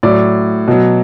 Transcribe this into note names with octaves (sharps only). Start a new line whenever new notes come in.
A2 F#3 D5
B2 F#3